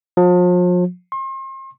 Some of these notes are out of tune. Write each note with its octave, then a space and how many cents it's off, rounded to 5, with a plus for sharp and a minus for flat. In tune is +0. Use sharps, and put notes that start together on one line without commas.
F3 +40
C6 +40